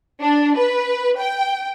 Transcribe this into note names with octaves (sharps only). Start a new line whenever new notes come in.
D4
B4
G5